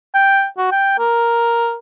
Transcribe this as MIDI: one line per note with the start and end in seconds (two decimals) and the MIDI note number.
0.15 0.47 79
0.58 0.69 66
0.72 0.98 79
0.99 1.75 70